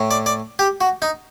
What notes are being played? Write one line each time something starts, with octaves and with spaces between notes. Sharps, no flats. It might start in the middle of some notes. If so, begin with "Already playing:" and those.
Already playing: A2
D5
D5
G4
F#4
D#4